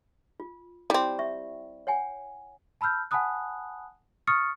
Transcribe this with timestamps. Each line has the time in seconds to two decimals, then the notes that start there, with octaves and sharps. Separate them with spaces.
0.40 F4
0.90 G3 C4 E4
1.19 E5 C#6
1.87 C#5 F#5 G#5
2.81 A5 B5 E6 F6 G6
3.11 F#5 G#5 A5 B5 D#6 F#6
4.27 C#6 D#6 F6 A6 C#7